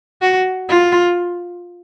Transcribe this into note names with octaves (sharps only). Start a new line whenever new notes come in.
F#4
F4